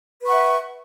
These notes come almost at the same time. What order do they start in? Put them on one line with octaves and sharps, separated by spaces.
B4 C#6 F#5 E5